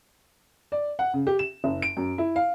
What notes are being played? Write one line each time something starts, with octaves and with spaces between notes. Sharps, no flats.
D5
F#5
C#3
G4
E7
F#1
D7
F#2
E4
F5